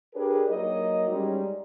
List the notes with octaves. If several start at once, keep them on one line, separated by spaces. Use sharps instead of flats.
D4 G4 G#4 A#4 B4 C#5
F#3 A#3 D#4 D#5
G3 G#3 C#4 D#4